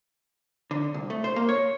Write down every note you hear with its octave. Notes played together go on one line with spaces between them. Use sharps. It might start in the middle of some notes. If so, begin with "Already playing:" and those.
D3
C2
A3
C5
A#3
C#5